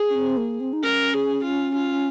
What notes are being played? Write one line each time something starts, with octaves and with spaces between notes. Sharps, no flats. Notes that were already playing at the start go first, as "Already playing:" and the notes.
Already playing: G#4
C#4
C4
A#3
C4
D#4
C#4 A#4
G#4
F4
F4